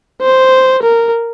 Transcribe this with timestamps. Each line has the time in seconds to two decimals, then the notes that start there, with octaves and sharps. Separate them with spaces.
0.21 C5
0.83 A#4